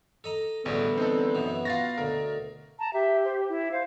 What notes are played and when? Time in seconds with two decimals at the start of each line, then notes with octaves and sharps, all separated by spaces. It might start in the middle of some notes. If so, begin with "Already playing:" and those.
0.24 A4 D#5 A#5
0.66 A1 E2 G2 B2 D3 B3
0.97 C4 D#4 A4
1.35 F#2 B2 E3
1.65 F4 F#4 F5 A6 A#6
1.98 D2 B2 A#4
2.79 A5 A#5
2.93 G4 E5
3.25 C5
3.49 E4
3.72 C5 F5